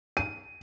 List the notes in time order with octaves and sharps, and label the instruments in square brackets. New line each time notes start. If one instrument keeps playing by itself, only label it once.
[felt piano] D#7